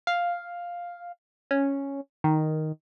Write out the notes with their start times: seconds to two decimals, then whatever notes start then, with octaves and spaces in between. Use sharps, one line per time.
0.07 F5
1.51 C#4
2.24 D#3